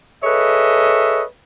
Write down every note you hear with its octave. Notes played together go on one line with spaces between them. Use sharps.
G#4 A4 B4 C#5 D#5 E5